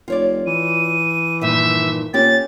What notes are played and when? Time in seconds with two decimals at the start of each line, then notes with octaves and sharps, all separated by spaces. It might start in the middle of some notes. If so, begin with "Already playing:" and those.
0.08 F1 F4 C#5 D5
0.47 E3 D#7
1.41 G2 A#2 D#3 E5
2.14 A#2 C#4 G4 A6